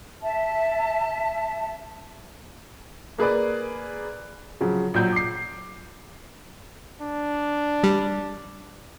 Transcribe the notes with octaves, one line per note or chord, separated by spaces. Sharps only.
E5 A5
A#3 G#4 B4 D5
C#3 F3 F#3
A#1 F#3 G6
D6 C7
D4
G3